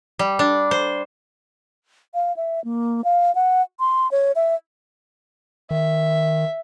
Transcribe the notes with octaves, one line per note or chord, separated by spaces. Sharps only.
G3
D4
C5
F5
E5
A#3
F5
F#5
C6
C#5
E5
D#3 E5